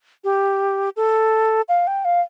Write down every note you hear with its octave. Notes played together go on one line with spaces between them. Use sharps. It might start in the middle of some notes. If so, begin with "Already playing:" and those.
G4
A4
F5
G5
F5